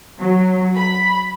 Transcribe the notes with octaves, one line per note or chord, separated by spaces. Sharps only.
F#3
B5